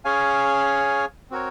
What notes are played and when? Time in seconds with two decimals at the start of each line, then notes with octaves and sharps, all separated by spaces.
0.05 C#4 G#4 C#5 F5 G#5
1.31 C4 F#4 A#4 C#5